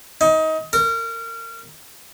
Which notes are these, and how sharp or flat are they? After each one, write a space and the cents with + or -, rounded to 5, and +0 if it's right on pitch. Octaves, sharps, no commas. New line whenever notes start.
D#4 +25
A#4 -30